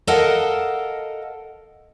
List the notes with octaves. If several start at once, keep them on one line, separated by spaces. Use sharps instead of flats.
A4 A#4 D#5 F5 F#5 A5